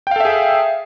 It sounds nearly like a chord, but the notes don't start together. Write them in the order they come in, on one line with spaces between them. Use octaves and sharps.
G5 F5 A4 E5 G#4